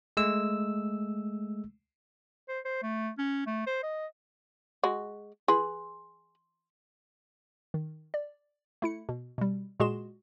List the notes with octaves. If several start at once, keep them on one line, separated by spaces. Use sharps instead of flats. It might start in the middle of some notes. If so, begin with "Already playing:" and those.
G#3 A3 E6
C5
C5
A3
C#4
A3
C5
D#5
G#3 F#4
G#4 B4 C6
D#3
D5
A3 E4 C#7
B2
B2 G3
A#2 G#3 F#4 G#4 C6 E7